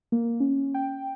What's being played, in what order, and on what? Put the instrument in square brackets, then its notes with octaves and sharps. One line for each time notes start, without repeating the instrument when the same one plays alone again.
[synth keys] A#3
C#4
G5